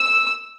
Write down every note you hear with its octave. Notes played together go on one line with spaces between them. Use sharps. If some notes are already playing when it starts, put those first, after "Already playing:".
Already playing: E6